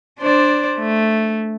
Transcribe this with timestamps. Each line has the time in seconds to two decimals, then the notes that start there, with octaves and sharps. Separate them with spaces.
0.19 D4 C5 D5
0.79 A3